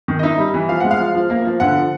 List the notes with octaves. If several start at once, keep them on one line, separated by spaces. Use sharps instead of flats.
D#3
D#5
D#4 E5
G3
E3
F3 F5
G#3 F#5
F5
F3
F3
A#3
F3
D3 F#5
F3